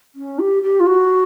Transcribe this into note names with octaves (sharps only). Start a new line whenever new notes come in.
C#4
G4
G4
F4
F#4